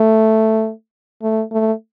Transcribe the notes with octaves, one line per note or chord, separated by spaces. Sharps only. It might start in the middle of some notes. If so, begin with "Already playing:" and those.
Already playing: A3
A3
A3